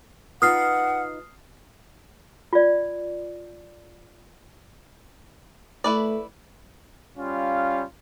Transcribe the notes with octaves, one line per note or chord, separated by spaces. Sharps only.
D#4 F4 B4 F#5 D#6 F6 C7
F4 D5
A3 E4 B4 D5
G3 C#4 F4 F5